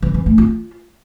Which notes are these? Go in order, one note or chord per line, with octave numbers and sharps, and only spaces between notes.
E3
E3
A3
F4